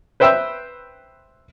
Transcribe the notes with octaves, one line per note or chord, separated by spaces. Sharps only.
B4 C5 E5 G5 C6 E6